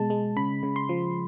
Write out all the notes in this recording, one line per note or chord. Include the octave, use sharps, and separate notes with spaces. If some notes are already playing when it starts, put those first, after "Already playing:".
Already playing: B2 G#3 A5
G#3
C#3 B5
C#3
C6
F3